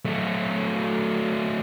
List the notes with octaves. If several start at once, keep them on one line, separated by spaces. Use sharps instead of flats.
F#3 A3